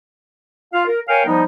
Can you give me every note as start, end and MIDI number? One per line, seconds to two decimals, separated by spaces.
0.73 0.83 65
0.73 0.83 77
0.87 1.00 70
1.08 1.23 70
1.08 1.23 73
1.08 1.23 77
1.08 1.23 79
1.08 1.23 80
1.26 1.43 53
1.26 1.43 55
1.26 1.43 59
1.26 1.43 63